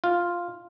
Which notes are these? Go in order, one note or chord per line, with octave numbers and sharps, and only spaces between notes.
F4